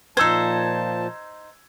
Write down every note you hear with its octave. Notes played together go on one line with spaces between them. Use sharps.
A#2 F3 D#4 C5 A5 E6 G#6